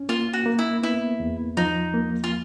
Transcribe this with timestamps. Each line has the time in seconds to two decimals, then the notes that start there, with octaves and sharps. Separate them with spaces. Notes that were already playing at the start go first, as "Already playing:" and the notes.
Already playing: C#4
0.09 A#3 F4
0.33 F#4
0.46 A#3
0.59 E4
0.83 B3 E4
1.20 E2
1.57 F3 D#4
1.94 A#3
2.24 F4